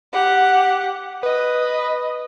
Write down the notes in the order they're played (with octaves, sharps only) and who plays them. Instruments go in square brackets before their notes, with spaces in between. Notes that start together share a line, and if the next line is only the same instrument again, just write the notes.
[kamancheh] G4 F#5
[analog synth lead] B4 [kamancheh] D#5